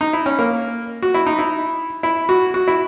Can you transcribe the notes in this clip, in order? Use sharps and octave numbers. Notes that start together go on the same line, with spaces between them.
D#4
E4
C#4
A#3
F#4
E4
D#4
E4
E4
F#4
F#4
E4